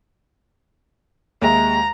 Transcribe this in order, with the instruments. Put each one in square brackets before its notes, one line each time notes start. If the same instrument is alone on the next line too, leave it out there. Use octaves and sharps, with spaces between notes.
[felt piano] D#2 G#3 E5 [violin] A#5